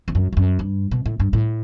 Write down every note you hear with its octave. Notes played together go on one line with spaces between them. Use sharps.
E2
F#2
E2
F#2
G2
B2
A2
G2
A2